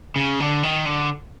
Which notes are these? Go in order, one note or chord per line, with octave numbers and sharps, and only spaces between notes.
C#3
D3
D#3
D3